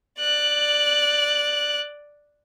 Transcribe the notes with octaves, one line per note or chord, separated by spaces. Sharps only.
D5 F#6